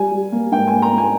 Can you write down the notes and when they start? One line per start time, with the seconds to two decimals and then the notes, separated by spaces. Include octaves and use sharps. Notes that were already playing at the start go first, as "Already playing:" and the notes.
Already playing: G3 G#5
0.11 G3
0.32 A#3
0.52 G#2 G5
0.68 G#5
0.72 A#3
0.82 A#5
0.93 A#3
0.98 G#5